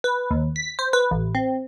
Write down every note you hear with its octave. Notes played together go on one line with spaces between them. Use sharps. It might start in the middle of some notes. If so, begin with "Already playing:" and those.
B4
D#2
B6
C5
B4
A1
C4